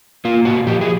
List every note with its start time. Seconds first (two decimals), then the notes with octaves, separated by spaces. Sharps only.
0.25 A#3 F4
0.45 A#2 F#4
0.67 F3 G4
0.81 G#4